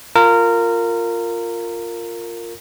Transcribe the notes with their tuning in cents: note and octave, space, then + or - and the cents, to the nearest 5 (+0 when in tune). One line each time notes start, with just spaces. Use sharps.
F4 +0 A#4 -20